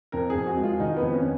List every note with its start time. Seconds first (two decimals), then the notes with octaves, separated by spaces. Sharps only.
0.12 F2 A#4
0.30 F2 G#4
0.47 F#4
0.57 G#3
0.63 F4
0.80 D#3 D#4
0.97 B3
1.02 F2
1.14 C#4